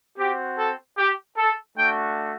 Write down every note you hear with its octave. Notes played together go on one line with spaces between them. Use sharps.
C4 F#4 G4
A4
G4
A4
A3 D4 F#4 G5